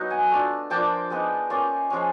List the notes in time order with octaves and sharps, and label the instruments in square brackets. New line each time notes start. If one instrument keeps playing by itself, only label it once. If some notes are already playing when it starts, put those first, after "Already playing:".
Already playing: [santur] F#3 B3 D#4
F#5 G#5
A3 D4 F4
F3 A#3 D4 F4 G5 A5
G#3 B3 D#4
A#3 C#4 F4
F3 G#3 C#4